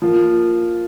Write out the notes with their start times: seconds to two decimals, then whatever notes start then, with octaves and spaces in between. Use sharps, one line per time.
0.02 F3 A#3 F4